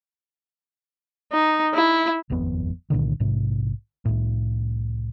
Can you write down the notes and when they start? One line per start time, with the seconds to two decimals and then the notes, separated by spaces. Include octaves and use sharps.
1.32 D#4
1.74 E4
2.30 D#1 G#1 F2 B3
2.90 C2 A#2 D3 D#3
3.20 A#1 G#2 C3
4.05 C2 A2